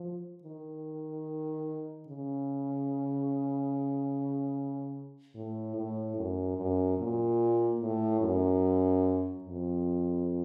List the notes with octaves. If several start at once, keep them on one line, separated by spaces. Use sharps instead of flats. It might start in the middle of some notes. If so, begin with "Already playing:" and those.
Already playing: F3
D#3
C#3
A2
A2
F#2
F#2
A#2
A2
F#2
F2